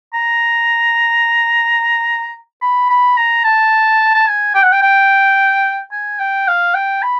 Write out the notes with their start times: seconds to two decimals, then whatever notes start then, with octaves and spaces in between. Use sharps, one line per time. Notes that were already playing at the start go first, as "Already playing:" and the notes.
0.14 A#5
2.62 B5
2.89 B5
3.17 A#5
3.44 A5
4.14 A5
4.27 G#5
4.55 G5
4.63 F#5
4.72 G5
4.82 G5
5.92 G#5
6.20 G5
6.48 F5
6.75 G5
7.02 B5